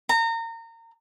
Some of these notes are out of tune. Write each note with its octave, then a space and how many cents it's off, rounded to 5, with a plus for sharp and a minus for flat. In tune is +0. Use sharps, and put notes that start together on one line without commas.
A#5 -30